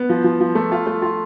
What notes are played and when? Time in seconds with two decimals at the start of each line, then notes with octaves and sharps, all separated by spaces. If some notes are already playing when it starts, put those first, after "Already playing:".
Already playing: B3
0.09 F3
0.24 F3
0.41 F3
0.55 A3
0.72 F4
0.87 A3
1.02 F4